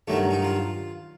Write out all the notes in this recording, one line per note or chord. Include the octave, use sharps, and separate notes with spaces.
G2 D#3 F#3 A3
D#4
F4